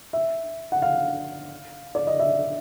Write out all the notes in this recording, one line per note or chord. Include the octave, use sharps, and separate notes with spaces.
E5
F#5
F5
D5
D#5
E5